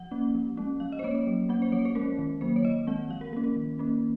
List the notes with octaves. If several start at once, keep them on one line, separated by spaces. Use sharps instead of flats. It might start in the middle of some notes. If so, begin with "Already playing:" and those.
Already playing: F3 F#5
A#3 C#4
F3
G#3 C#4
F3 F5
D#5
C5
A#3 C#4 C#5
C#5
F#3
A#3 C#4 F#5
C5
F3 C#5
C5
G#3 C#4 A#4
D#3
F#3 A#3 C5
C#5
D#3 D#5
G#3 C4 F#5
F3 F5
A#4
A#3 C#4 A#4
A#4
D#3
A#3 C#4